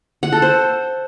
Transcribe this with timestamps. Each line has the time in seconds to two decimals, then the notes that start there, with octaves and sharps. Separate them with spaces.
0.23 F#5
0.32 A4
0.42 C5